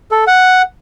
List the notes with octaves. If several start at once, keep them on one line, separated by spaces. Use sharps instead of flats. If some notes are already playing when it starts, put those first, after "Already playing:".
A4
F#5